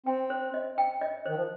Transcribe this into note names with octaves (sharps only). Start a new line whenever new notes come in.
C4 G5
C5
D#5
G5
D#5
D#3 C5
F3